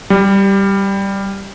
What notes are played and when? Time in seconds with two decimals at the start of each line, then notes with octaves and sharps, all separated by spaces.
0.10 G3